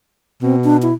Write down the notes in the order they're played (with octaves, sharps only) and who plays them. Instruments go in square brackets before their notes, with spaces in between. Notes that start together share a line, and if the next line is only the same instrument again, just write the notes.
[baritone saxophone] B2 [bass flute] C4
[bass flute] D4
E4